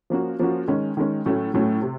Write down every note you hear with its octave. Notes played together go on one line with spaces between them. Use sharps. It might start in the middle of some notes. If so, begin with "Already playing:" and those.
F3 A#3 C#4 F#4
F3 A#3 C#4 F#4
D#3 G#3 C#4
D#3 G#3 C#4
A2 F#3 A3 C#4
A2 F#3 A3 C#4
C3